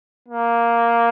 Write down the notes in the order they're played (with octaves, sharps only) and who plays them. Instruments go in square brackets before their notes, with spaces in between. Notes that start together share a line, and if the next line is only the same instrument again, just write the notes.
[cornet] A#3